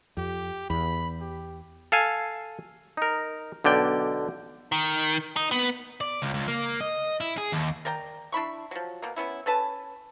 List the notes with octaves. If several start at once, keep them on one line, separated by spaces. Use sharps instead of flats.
F2 G4
E2 B5
G4
A4 F5 G#5
D#4 A#4
B1 D3 D5 G5
D#3
D#4
B3
D5
C#2
C#2
A#3
D#5
E4
G#4
D#2
A#4 D5 G5 A#5
D4 E4 B5 C#6
F3 F#3
B2 A#3
B3 C#4 E4
C#4 A4 B4 A5